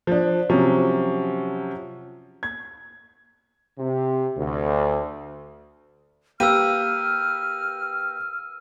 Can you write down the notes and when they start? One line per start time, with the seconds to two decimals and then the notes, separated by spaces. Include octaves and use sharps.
0.07 F3 D4
0.50 C3 F3 F#3 C#4
2.43 G#6
3.78 C3
4.36 D2
6.40 A#3 G4 B4 E6 F6 D#7